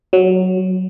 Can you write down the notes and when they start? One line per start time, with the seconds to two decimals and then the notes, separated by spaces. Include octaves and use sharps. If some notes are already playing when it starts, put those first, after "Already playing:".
0.13 F#3